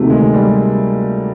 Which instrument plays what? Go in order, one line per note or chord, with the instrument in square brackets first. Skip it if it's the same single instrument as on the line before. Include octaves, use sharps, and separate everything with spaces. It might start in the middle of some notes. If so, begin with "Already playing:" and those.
Already playing: [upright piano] D2 C3 D#3 [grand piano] A3 A#3
[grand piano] G#3
G3